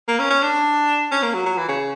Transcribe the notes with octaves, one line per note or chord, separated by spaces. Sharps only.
A#3
C#4
C#4
D4
C#4
A#3
F#3
F#3
E3
C#3